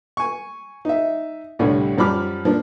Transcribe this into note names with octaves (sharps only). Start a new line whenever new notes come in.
G#5 C#6
D#4 E5
C2 A2 D3 G3 C#5
F#2 F3 G3 B5 D6 F6
F3 A#3 D4